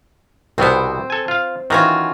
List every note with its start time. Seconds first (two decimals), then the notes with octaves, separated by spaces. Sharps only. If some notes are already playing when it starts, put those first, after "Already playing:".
0.58 C2 B2 B3 C4 C5
1.10 A4 G#5
1.28 F4 F5
1.70 D#3 E3 C#4 F4 F#4 A#5